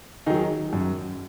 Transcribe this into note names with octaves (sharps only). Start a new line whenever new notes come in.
D#3 F#3 D#4 G#4
F#2